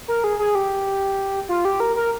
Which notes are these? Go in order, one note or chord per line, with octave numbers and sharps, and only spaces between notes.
A#4
G#4
G#4
G4
F4
G4
A#4
A#4